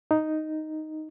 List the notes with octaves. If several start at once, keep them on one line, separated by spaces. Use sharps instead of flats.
D#4